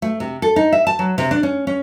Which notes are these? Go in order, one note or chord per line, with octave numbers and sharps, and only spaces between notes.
A3
C3
A4
D#4
E5
A5
F#3
C3
D4
C#4
C#4